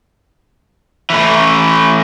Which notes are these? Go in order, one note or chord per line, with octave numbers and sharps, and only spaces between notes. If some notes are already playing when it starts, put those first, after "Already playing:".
A2 E3